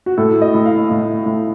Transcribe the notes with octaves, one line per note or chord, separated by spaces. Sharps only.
F#4
A2 A4
D#5
A2
F5
A2
A2